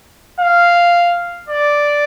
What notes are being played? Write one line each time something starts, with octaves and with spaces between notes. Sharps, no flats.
F5
D5